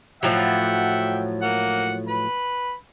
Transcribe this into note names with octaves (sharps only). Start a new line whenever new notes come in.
A2 F3 F#3 E5 F#5 G5
A#3 F#5
B4 B5